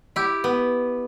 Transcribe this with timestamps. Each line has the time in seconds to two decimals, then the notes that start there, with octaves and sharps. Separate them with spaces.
0.16 E4 G4
0.44 B3